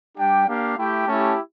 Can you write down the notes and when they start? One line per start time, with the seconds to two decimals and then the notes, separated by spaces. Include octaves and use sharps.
0.17 G3 D4 G4 G5
0.47 A#3 D4 G4 F5
0.77 A3 E4 G4 G5
1.07 A3 C#4 E4 G4 A5